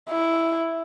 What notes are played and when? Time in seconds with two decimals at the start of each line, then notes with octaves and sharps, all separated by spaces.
0.10 E4